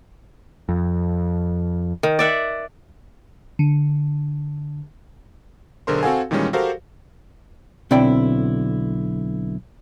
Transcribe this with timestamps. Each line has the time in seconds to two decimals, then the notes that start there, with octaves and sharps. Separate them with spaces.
0.69 F2
2.03 D#3
2.19 D5 E5 F#5
3.59 D3
5.87 B1 D3 G#4 A#4 C5 C6
6.03 C4 F#4 A4 F5 F#5 G#5
6.31 A#2 D#3 E3 G3 G#3 C#4
6.53 F#4 G4 A4 A#4 C5 F5
7.91 B1 D3 C4 E4 D5 G5